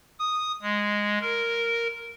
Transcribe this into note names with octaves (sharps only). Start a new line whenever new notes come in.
D#6
G#3
A#4